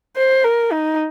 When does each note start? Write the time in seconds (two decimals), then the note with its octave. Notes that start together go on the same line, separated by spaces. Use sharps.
0.17 C5
0.44 A#4
0.72 D#4